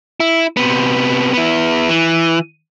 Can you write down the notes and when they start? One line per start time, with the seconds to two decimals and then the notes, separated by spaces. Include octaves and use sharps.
0.20 E4
0.57 C3 B3
1.33 B3 E4
1.89 E3